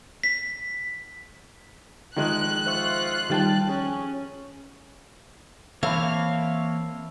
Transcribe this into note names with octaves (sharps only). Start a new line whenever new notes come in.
B6
D#3 F3 G#3 F#6
F4 C5 E5 C#6
D#3 F3 G3 G5 A5 A6
C#4 G#4
E3 A#3 C4 C#5 E5 F5 A5 B5